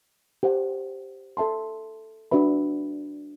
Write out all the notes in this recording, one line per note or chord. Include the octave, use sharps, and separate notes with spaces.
G4 C5 F#5
A4 E5 A5 C6
D4 F#4 B4 E5 B5